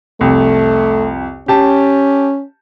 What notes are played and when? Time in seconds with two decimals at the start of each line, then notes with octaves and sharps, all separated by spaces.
0.21 C2 F2 A3
1.48 C#4 G4 A5